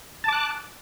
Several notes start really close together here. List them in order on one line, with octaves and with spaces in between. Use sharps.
A5 D6 F#6